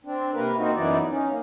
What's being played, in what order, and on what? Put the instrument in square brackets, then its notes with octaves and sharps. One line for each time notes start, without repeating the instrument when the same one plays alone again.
[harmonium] C4 D4
C3 A#3 A#4 B4
A#3 C4 D#4 F#4
F#2 E3 B3 D#4 E4 D5
C#4 D#4
A#3